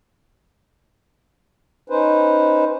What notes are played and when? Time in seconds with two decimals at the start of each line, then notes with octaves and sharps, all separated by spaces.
1.90 C#4 D#4 B4 C5